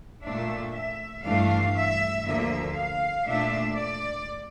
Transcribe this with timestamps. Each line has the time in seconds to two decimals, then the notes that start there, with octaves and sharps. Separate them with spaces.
0.23 A#2 A3 D4 E5
0.74 E5
1.24 G2 E3 A3 D4 F5
1.74 E5
2.24 D2 D3 F3 A#3 E5
2.75 F5
3.25 A#2 A3 D4 E5
3.75 D5